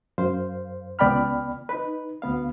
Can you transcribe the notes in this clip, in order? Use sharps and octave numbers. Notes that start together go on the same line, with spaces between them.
F#2 C5 F5
C#2 B3 D5 G5 B5 F6
D#4 B4
D2 B3 F5